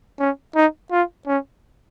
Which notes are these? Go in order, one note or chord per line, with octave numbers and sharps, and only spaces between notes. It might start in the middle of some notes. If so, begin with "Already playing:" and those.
C#4
D#4
F4
C#4